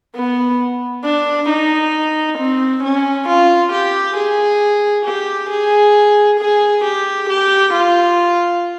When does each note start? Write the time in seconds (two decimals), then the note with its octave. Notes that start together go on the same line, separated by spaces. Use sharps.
0.15 B3
1.05 D4
1.49 D#4
2.39 C4
2.83 C#4
3.28 F4
3.73 G4
4.17 G#4
5.06 G4
5.50 G#4
6.40 G#4
6.84 G4
7.30 G4
7.74 F4